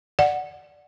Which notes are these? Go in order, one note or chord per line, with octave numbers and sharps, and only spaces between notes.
D5 F#5